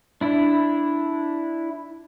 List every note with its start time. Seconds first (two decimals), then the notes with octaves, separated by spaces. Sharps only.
0.21 D4 E4